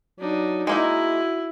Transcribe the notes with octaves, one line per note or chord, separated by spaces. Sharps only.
F#3 D4 D#4
G#3 A#3 D#4 E4 F#4